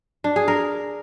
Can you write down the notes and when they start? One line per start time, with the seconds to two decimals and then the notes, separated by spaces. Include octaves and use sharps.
0.24 D4
0.36 G#4
0.48 A#4